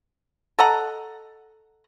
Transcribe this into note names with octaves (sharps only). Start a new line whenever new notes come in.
A4 D#5 F#5 A#5